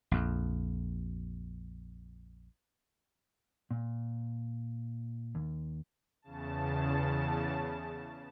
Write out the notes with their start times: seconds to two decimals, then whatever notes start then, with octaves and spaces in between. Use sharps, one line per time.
0.11 A#1 F2
3.71 A#2
5.35 D#2
6.22 E2 C#3 A5